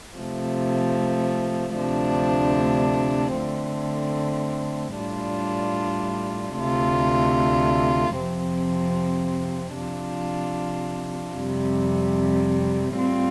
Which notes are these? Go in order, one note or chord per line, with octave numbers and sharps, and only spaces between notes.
C3 F3 A3
D2 C3 F3 A3 D4
D3 A3 C4
A2 G3 D4 F4
D2 C3 A3 F4
F2 C3 F3 C4
C3 F3 D4 F4
F2 C3 G3
A2 G3 C4 F4